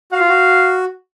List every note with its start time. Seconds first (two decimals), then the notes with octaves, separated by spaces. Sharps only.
0.12 F#4 F5
0.20 F4
0.29 F#4